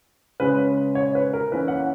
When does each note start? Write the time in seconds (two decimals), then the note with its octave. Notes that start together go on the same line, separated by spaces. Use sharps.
0.40 C#3 G#3 C#4 B4
0.95 C#5
1.15 B4
1.33 A#4
1.52 E3 A#3 C#4 B4
1.68 F#5